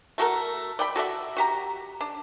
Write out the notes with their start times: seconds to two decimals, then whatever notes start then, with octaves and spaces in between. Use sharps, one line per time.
0.18 A3 F#4 A4 A#4
0.79 D5 G5 B5
0.96 F#4 A4 D5 E5
1.36 F#4 G4 A#5
2.01 D4